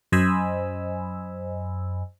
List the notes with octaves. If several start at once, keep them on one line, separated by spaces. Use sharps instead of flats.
F#2 C5 D#5 G#5 B5 E6